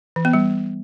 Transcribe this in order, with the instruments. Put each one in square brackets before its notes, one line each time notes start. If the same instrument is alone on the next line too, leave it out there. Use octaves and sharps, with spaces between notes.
[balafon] E3
B3
G3